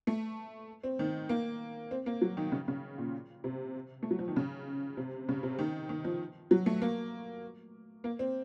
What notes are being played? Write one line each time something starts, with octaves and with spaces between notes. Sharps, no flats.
A3
C4
D#3
A#3
C4
A#3
F#3
D#3
C#3
C#3
A#2
C3
A3
F#3
F3
D#3
C#3
C3
C#3
C3
D#3
D#3
F3
F#3
A3
A#3
A#3
C4